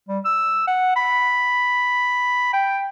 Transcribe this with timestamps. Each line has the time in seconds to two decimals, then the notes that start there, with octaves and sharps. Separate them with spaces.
0.08 G3
0.25 E6
0.67 F#5
0.96 B5
2.53 G5